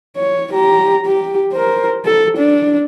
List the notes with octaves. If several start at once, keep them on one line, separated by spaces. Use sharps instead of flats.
C#5
G4 A#5
G4
A#4 C5
A4
D4